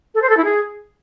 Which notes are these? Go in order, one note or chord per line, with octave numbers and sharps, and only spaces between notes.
A4
C5
A4
E4
G#4